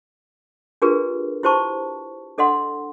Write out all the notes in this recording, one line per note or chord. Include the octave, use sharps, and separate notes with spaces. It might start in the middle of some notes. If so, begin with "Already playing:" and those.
D4 F4 G4 G#4 A#4 B4
E4 G4 C5 A5 C#6
D4 A4 D#5 F#5 C6